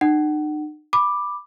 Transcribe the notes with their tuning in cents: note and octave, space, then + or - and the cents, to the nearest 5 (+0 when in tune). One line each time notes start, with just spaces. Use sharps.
D#4 -45 F#5 +30
B5 +0 D6 +10